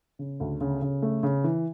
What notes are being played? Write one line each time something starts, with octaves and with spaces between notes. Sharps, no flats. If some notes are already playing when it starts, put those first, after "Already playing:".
C#3
D2
C#3
C#3
A3
C#3
E3